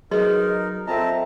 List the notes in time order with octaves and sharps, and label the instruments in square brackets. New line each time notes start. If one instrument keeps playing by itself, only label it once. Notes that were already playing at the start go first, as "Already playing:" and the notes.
[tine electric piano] F#3 [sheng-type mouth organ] D#4 A#4 [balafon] G#4 B4 [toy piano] D#5 C6
[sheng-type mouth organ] C4 A5 A#5 [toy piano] F4 A4 [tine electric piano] D#5 E5